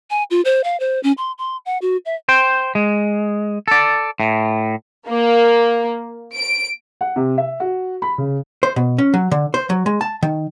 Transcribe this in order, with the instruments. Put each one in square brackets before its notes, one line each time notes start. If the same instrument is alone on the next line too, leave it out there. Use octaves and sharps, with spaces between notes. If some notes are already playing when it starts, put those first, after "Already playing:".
[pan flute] G#5
F4
C5
F5
C5
C#4
C6
C6
F#5
F#4
E5
[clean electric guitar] C5 G5
G#3
A4 D5
A2
[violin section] A#3
D7
[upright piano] F#5
C3
E5
F#4
B5
C#3
[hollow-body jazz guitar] C5
B2
C#4
F#3
D3
C5
F#3
G#3
A5
D#3